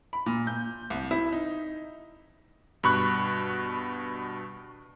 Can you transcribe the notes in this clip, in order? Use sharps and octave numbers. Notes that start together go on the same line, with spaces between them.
B5
A#2
G6
C2
E4
D#4
G2 B2 B5 C#6 F#6